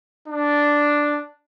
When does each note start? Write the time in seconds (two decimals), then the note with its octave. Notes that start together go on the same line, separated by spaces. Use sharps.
0.28 D4